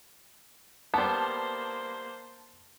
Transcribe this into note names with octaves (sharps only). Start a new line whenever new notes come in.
G3 A#3 B3 C5 A5